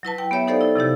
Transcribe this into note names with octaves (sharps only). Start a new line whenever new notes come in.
F#3 E4 B4 A5
G5
B3 G4 C#5 E5
D#4 G4 A4 C5 D5 F5
E4 A4
C3 F3 D#4 G4